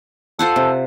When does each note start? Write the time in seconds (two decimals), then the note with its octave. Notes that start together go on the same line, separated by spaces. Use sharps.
0.39 F4 A4 C5 F#5
0.56 C3